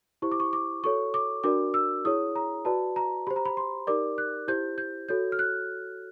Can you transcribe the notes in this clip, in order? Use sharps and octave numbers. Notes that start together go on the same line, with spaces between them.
E4 G4 C5 C#6
D6
C#6
D6
F#4 A4 C#5 C#6
D6
D4 F#4 A#4 D5 D6
E6
E4 G#4 C#5 D#6
A#5
F#4 B4 D5 A5
A#5
G4 C5 B5
A#5
B5
C6
D#4 G4 A#4 D5 D6
F#6
E4 G4 C5 G6
G6
F#4 A4 C#5 G6
F6
F#6